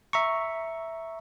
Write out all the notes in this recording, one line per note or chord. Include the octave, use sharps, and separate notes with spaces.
E5 A#5 C#6